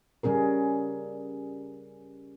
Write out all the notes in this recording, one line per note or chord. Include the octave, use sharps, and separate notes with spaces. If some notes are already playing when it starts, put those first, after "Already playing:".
C#3 G3 C#4 G#4 A#4